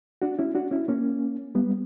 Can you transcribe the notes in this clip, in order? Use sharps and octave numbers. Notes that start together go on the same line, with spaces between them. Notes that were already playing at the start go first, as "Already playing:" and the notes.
D4 F#4
C#4 E4
D4 F#4
C#4 E4
A#3 C#4
G3 B3